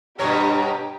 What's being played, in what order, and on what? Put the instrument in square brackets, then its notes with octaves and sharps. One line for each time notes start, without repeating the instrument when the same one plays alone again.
[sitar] G2 B2 C#5 [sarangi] G4 [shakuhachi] A#5